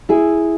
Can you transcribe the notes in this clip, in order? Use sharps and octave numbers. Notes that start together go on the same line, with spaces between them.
E4 G#4